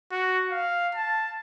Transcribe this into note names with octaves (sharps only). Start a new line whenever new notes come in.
F#4
F5
A5